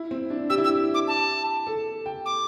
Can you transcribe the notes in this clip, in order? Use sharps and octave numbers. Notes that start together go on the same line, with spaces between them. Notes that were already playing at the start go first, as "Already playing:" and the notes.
Already playing: E4
C4
D4
G4 E6
E4
G4 E6
D6
A5
A4
G5
D6